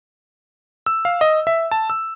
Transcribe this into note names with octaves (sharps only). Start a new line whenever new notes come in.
E6
F5
D#5
E5
A5
E6